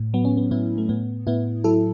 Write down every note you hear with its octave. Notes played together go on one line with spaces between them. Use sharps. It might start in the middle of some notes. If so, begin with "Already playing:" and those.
Already playing: A2
F#3 B3
C#4
B3
A2 B3 E4
A3
A2 B3
A2 B3 E4
F#3 E4 A4